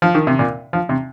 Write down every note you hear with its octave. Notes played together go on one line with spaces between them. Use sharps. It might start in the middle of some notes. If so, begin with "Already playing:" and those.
F3
D#3
C3
A#2
F3
C3